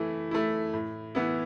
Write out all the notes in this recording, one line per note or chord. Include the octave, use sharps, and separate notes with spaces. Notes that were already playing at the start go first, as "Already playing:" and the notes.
Already playing: E3 A3 E4
A3 E4
A2
E3 B3 E4